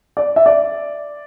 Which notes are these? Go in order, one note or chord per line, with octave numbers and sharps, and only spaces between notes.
D5
E5
D5